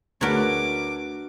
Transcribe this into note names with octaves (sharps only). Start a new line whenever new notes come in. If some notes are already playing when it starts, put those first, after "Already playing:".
D2 D4 F#4 A#4 B4 C#5 D6